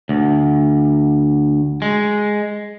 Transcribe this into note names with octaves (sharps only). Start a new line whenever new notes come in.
D2
G#3